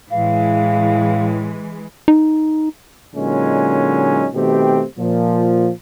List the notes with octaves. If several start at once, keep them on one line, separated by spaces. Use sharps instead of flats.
A2 E3 G#3 F5
D#4
A#2 D3 F#3 G#3 C#4 D#4
B2 D#3 A3 C4 G4
A#2 F3